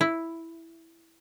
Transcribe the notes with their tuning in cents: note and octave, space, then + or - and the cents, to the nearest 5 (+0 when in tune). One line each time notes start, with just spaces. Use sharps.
E4 +0